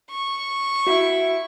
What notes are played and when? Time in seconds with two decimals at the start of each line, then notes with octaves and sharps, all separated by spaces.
0.10 C#6
0.87 E4 F#4